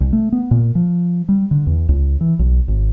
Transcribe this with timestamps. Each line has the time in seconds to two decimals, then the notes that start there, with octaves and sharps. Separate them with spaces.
0.01 C2
0.13 A3
0.32 B3
0.51 A#2
0.75 F3
1.29 G3
1.51 D3
1.67 E2
1.89 C#2
2.21 E3
2.39 B1
2.68 G#1